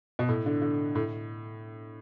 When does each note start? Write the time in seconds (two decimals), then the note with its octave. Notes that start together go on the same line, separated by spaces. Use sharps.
0.19 B2
0.29 A2
0.46 D3
0.62 D3
0.95 A2